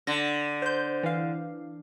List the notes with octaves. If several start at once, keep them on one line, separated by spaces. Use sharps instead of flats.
D3 A#6
C5 G6
E3 F5